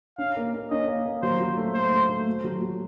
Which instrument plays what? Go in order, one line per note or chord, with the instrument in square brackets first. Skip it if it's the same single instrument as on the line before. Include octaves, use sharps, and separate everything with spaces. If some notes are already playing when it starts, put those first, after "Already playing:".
[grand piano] C#4 [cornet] F5
[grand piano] A#3
A#3
[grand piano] C#4 [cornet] D#5
[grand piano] A#3
A#3
[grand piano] F#3 [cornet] C5
[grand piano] F#3
A3
[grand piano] A3 [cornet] C5
[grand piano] A3
A3
A3
F#3
F#3